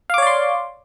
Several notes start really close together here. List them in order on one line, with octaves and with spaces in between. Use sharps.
F5 D6 C#5 D5 C6